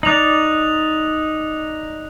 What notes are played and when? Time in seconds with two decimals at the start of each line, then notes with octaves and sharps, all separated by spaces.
0.03 D#4 D5 F#6 F7 F#7